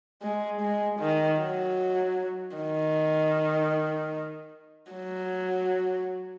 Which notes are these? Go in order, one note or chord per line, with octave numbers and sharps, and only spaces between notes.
G#3
G#3
D#3
F#3
D#3
F#3